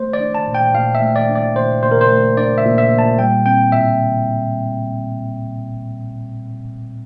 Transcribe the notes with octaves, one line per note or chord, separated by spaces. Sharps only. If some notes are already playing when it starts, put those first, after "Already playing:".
Already playing: A3 C5
D5
D4
A5
A#2
G5
A#2 F5
E5
A3
D5
D4
D5
A#2 C5
A#2 C5
A#4
C5
A3
D4 D5
E5
A#2
E5
A#2
A5
G3 G5
C4 G5
A2 E5